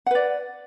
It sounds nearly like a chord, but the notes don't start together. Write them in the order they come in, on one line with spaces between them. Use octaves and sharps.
F#5 B4 D5